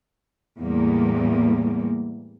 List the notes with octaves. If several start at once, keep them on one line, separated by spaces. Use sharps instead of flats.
E2 A2 G3 A#3